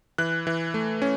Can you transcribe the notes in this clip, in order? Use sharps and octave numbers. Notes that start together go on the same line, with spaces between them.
E3 F#6
E3
A3
C#4